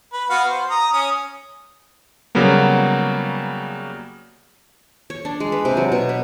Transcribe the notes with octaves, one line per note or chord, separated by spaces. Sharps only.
B4
B3 F#4 F5
C5
A#5 D#6
C#4 D#6
C#3 F#3 G3 A#3 B3
C#5
D4
G#3
B4
C3
F#3
B2
B4